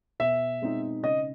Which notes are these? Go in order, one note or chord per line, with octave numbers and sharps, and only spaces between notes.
B2 E5
G#3 C4 D#4
C#3 D#5